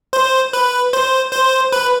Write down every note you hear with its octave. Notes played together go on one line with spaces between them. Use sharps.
C5
B4
C5
C5
B4